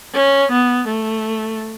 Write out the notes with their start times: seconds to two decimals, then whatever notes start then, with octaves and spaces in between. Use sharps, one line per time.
0.15 C#4
0.52 B3
0.88 A3